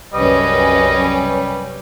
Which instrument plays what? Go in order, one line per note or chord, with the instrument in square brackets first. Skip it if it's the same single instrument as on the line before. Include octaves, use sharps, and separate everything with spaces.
[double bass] C2 F#2 [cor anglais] G3 [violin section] C#4 B4 [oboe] D#5